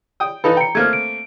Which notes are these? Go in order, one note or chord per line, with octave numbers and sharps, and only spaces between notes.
G5 D#6
E3 D#4 A4 B4 F5 B5
G5 A#5 C#7
A3 A#3 C4 F6 G#6
D7